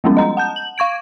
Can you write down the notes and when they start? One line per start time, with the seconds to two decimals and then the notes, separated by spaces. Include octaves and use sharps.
0.04 F3 G3 G#3 B3 C#4
0.17 D#5 A#5
0.37 F#5 A5 G6
0.56 F#7
0.78 F5 C#6 G#6 D7